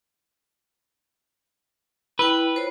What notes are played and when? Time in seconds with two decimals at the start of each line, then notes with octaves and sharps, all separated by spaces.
2.19 E4 B4 G5
2.55 F4 C5 C#5